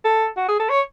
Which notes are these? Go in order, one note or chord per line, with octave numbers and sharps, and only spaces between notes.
A4
F#4
G#4
A4
C#5